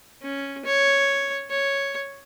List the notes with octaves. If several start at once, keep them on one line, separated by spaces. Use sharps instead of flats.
C#4
C#5
C#5